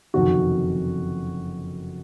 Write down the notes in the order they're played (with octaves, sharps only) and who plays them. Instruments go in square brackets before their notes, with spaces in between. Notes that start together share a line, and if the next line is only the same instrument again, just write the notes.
[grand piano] F#1 F2 C3 D#3 F#4